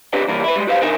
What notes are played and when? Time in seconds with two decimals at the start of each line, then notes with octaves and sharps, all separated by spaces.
0.13 C4 D4 G4 B4 D5 G5
0.28 C3 E3 G3 A#3
0.44 E4 B4
0.56 G3 G#3
0.67 F#4 G4 B4 C5 E5 F5
0.81 F2 D4 D#4 A#4 E5 G#5